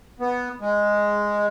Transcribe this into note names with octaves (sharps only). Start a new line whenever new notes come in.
B3
G#3